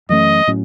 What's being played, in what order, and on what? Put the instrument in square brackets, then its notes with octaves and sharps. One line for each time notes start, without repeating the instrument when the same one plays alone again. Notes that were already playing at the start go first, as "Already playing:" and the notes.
[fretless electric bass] F#2 E3 A3 C#4 [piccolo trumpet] D#5
[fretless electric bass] A2 F#3 C#4